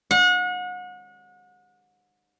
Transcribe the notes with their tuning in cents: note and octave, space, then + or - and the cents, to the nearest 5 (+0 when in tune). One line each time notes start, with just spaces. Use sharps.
F#5 -35